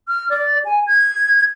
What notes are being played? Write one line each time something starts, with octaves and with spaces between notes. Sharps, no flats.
F6
D5
G#5
G#6